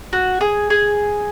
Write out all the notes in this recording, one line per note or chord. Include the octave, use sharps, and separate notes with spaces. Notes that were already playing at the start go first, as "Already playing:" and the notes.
F#4
G#4
G#4